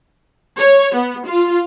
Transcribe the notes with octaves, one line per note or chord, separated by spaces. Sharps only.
C#5
B3
F4